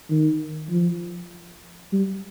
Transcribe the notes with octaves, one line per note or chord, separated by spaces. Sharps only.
D#3
F3
G3